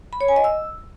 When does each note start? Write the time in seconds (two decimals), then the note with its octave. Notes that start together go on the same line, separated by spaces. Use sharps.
0.13 B5
0.21 C#5
0.28 G#5
0.36 D#5
0.44 E6